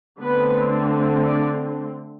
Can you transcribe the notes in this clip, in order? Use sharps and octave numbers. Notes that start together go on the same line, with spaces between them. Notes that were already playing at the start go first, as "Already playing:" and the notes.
D3 A3 B3 C4 B4
D4 D5